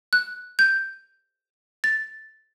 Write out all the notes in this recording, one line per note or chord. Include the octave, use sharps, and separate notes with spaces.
F#6
G6
A6